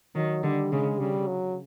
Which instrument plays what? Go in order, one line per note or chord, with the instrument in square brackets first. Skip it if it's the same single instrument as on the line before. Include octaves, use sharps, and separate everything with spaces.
[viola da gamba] D#3 [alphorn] F#3
[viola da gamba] D3 [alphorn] G3
[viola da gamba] C#3 [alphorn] G#3
[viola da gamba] C#3 [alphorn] G3
[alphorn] F#3